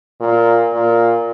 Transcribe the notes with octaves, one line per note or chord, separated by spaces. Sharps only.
A#2
A#2